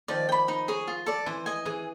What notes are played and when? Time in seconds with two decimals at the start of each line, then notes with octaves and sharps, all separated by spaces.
0.08 D#3 F3 D5
0.29 G5
0.32 B5
0.48 D#4
0.68 G#4 C#5
0.87 F4
1.06 A4 D5
1.26 E3 C5
1.46 D#5 G#5
1.65 E3 G#4